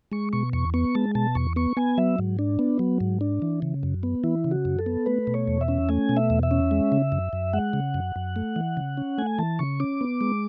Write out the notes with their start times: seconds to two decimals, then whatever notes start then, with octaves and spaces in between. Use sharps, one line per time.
0.12 G#3 C#6
0.33 B2 C#6
0.53 E2 C#6
0.74 B3 C#6
0.95 G#3 A5
1.15 B2 A5
1.35 E2 C#6
1.56 B3 C#6
1.77 B3 G#5
1.98 F#3 E5
2.19 G#2
2.39 D4
2.59 B3
2.79 F#3
3.00 G#2
3.21 D4
3.42 E3
3.62 C#3
3.83 F#2
4.03 B3
4.24 E3 E4
4.44 C#3
4.51 F#4
4.65 F#2
4.79 A4
4.86 B3
5.06 A3 B4
5.27 B2
5.34 C#5
5.48 E2
5.61 E5
5.68 C#4
5.89 A3 G#5
6.09 B2
6.17 E5
6.30 E2
6.43 E5
6.51 C#4
6.71 G#3
6.92 C#3
7.12 F#2
7.33 F#2
7.53 G#3 F#5
7.73 C#3
7.94 F#2
8.16 F#2
8.36 A3
8.56 E3
8.77 C#3
8.97 C#4
9.18 A3 G#5
9.38 E3 A5
9.59 C#3 C#6
9.80 C#4 D6
10.01 B3
10.21 G#3